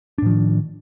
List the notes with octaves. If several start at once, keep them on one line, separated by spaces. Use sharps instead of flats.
A2 D#3 F3 D4